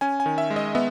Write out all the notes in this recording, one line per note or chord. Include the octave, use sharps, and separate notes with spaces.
C#4 G#5
G#5
D#3
E5
G#3
D#5
B3 E5